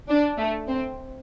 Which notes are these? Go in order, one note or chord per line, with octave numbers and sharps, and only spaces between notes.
D4
A3
C4